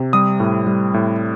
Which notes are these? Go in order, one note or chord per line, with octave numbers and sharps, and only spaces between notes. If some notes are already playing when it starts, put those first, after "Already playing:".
Already playing: C3
G3 D#6
A2
G3
A2